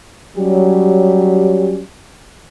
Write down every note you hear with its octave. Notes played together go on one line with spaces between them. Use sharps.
F#3 G3 C#4 G4